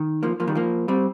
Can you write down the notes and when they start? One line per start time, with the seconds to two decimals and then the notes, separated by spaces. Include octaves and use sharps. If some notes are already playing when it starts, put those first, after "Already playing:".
Already playing: D#3
0.23 F3 A#3
0.40 F3 A#3
0.47 D#3 G3
0.55 F3 A#3
0.88 G3 C4